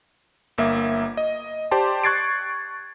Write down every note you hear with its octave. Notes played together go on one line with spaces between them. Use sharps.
G1 A#3 E5
D#5
G4 C5 D5 A5 C6
C#6 F#6 G#6 A6 C7 D7